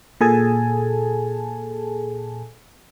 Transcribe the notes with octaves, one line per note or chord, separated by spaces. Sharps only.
A#2 G#4 A4 G#5 A5